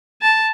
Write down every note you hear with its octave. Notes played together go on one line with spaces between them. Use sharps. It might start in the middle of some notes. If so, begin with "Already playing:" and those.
A5